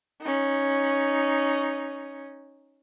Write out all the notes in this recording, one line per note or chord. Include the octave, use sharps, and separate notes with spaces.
C#4 D#4